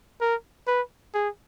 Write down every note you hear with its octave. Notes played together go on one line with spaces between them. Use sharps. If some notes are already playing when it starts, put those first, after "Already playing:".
A#4
B4
G#4